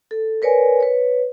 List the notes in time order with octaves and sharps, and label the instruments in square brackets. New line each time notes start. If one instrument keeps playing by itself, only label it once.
[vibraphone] A4
A#4 B4 C#5 D5 G#5
B4 C#5